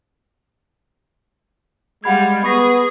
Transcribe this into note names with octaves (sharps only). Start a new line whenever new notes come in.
G3 G#3 F5 F#5 B5 G#6
B3 G#4 B5 C#6 A#6